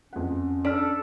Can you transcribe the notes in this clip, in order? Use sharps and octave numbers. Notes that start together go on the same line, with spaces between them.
F2 C#4 F#5
D4 A4 F6 B6 D7